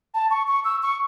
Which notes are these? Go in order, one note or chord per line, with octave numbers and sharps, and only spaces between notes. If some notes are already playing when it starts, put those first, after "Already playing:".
A5
C#6
C#6
E6
C#6